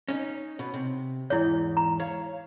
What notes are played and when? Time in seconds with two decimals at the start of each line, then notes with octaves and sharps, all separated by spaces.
0.08 C#4 D#4
0.59 B2
0.74 C3
1.30 E2 G#2 E4 C#5
1.77 A#5
2.00 C#5 F5